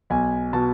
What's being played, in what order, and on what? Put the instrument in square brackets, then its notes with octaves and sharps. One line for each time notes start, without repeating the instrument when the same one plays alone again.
[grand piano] B1 G#5
B2 A5